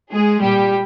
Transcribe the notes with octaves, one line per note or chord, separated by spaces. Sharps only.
G#3 G#4
A#2 G3 G4